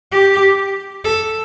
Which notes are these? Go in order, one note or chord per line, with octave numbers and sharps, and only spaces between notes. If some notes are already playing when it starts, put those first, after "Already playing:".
G4
A4